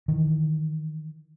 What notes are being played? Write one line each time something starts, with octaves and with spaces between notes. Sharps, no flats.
D#3 E3